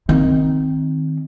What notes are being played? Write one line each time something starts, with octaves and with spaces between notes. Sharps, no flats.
D#3 C4